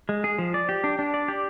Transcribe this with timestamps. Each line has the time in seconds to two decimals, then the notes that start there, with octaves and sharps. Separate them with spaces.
0.09 G#3
0.24 G#4
0.38 F3
0.54 D5
0.69 G4
0.84 D4
0.99 D4
1.14 D5
1.28 G4